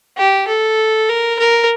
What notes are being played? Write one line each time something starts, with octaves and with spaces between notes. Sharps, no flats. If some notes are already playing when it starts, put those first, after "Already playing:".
G4
A4
A#4
A#4